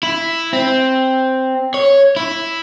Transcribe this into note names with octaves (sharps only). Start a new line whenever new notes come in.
E4
C4
C#5
E4